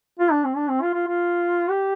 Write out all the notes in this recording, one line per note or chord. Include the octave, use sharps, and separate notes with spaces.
F4
D4
C4
D4
C4
F4
F4
F4
G4